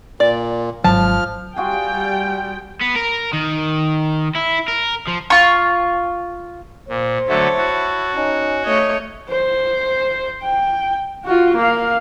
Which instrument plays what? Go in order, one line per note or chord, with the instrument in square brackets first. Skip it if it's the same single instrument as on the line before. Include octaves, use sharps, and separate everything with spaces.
[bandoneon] A#2 [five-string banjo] D5
[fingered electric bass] G#1 F#3 [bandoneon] F3 F6 [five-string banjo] A5
[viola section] G3 G5 [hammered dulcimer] F4 F#4 G#4
[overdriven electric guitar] B3
A#4
D#3
E4
A#4
F3
[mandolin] F4 C#6
[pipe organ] A#2 [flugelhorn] C5
[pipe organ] D3 F#3 A3 [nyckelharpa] C#5 A5 [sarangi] E5
[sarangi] E4 [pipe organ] F#4
[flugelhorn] C#4 [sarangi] D#4
[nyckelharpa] A3 D#5 [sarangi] C#5
[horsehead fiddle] C5
G5
F4 F#4
A#3 F5